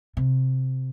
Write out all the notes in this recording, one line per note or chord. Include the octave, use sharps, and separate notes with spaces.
C3